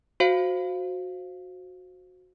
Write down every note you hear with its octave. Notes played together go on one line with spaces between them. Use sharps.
F#4 C5 F5